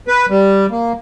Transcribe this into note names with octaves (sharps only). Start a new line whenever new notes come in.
B4
G3
A#3